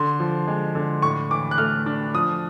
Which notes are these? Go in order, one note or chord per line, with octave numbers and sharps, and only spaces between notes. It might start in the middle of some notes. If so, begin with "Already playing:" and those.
Already playing: D3 C6
F3
G#3
D3
A2 C#6
E3 D6
F#6
A3 F6
D4
F3 D#6